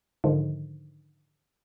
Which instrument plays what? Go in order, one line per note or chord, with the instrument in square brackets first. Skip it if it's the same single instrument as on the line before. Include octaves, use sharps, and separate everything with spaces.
[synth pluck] G#2 D3 D#3 F3 G#3